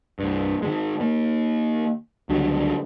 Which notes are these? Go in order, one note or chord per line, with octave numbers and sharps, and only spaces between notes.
C2 G2
D#3 F3 G#3
D#3 A#3
C#2 D3 F#3 G3